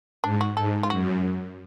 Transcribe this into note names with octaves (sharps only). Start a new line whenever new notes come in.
G#2 D4
F#4
G#2 A4
F4
F#2 F#4